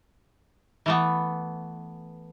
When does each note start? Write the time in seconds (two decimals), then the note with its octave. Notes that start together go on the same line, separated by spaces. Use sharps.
0.86 E3 A3 B3